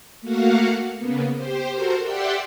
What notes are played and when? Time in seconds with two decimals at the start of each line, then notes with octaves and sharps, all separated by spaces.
0.21 A3 A#3 F#4 F5 F#5
0.97 C#3 A#3 B3
1.34 G4 C5
1.72 F#4 A4 A#4 C5
2.03 G4 D5 E5 F#5 G5 C6